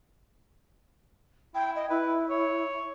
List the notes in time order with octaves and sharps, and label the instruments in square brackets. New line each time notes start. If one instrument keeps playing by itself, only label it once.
[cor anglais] E4 [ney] G5
[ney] D#5
[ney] E4 [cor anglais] B4
[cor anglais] C#5